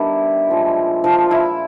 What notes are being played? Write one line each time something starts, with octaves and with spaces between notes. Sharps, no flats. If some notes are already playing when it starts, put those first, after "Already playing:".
Already playing: D#3 G3 B3 D4 E4
A#2 F3 G#3
F3 F4
E4